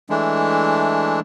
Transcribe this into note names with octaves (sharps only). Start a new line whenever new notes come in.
E3 G#3 A3 D4